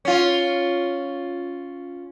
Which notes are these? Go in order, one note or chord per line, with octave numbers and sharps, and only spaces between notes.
C#4 F4